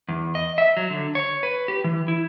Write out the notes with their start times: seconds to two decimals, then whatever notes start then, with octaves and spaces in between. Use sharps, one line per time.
0.08 E2
0.35 D#5
0.58 E5
0.77 F#3
0.90 D3
1.15 C#5
1.43 B4
1.68 G4
1.84 E3
2.08 E4